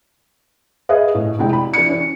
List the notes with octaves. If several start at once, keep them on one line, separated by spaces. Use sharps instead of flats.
G#4 B4 D#5 F5
A2
F1 G#3 E4 G5
B5
E3 D4 C#7
C#4